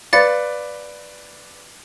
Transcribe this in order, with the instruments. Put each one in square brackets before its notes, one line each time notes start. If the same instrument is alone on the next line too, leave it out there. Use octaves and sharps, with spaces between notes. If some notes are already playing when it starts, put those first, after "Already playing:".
[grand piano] B4 D5 [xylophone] F5 A6 C#7